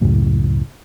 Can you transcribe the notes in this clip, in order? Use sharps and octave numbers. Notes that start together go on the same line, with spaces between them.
C#2 F#2 A2